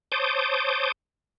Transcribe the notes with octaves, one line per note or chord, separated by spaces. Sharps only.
C5 C#5 A5 D6 D#6 G6